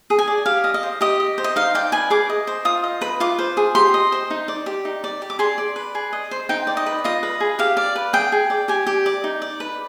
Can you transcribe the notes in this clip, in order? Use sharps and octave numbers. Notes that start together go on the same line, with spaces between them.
G#4
G#5
D5
G4 F5
D#5
D#5
C5
G4 D#5
D#5
C5
D#5
D#4 F5
D5 G5
B4 G#5
G#4 D6
D#5
C5
F4 D#6
D#5
B4
F4 D6
C5
G#4
G4 C6
D#5
C5
D#4
D5
G4
D#4
D5
G4
D6
G#4 C6
D5
B4
G#4
D#5
C5
D#4 G5
D5
D#5
B4
F4 D#5
B4
G#4
G4 F5
D5
B4
G#4 G5
G#4
D5
G4 G#5
G4
D5
D#4
D5
B4